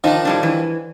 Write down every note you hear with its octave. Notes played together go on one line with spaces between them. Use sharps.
D#3 F3 D4 D#4
A2 G3 D4
E3